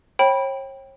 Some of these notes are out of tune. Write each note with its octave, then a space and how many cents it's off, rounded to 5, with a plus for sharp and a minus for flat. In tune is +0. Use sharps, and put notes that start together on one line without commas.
C#5 -40 G5 +0 B5 -15